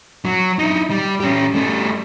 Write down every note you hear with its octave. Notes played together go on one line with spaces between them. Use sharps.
F#3
D#4 E4
G3
C#4 G4
G3 A3